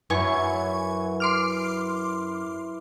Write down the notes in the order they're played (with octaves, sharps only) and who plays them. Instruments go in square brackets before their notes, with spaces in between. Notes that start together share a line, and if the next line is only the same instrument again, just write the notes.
[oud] F#2 [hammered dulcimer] E3 E4 [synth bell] G#5 C#6
[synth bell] C6 D6 F6